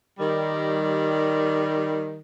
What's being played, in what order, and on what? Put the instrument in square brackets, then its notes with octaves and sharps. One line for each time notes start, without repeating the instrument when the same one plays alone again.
[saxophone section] D#3 G3